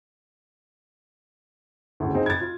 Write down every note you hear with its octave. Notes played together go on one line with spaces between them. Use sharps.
D2 A2 C#3
C4 D#4 G#4
G#6 A6
F4